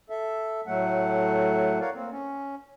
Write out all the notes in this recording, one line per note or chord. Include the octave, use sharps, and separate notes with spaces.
A4 E5
A2 F#3 A3 F#5
A#4 C#5 D5 F5 F#5
A#3 C4
C#4